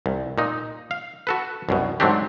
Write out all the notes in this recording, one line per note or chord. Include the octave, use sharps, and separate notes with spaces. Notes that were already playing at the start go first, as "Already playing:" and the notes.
C2
A#2 D#4
F5
F#4 A4 B4
C2 F#2 B2
G#2 F#3 A3 C4 D4 G4